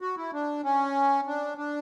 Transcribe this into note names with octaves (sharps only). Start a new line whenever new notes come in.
F#4
E4
D4
C#4
D4
D4